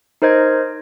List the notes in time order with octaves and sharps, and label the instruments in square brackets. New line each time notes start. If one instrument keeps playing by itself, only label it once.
[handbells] D#4 A#4 C5 D#5 G#6